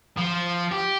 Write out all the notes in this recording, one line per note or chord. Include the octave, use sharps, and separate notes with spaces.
F3
G4